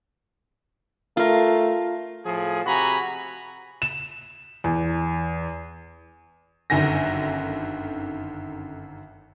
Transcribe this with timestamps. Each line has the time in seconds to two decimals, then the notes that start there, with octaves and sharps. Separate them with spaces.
1.17 A3 F4 A#4
2.25 A2 F3 G#4
2.66 C3 F#4 G#5 A#5 B5
3.82 E7
4.64 E2
6.70 G1 F#2 D3 D#3 G#5 A#6